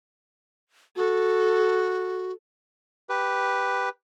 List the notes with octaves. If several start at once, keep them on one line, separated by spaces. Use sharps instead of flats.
F#4 A4
G4 B4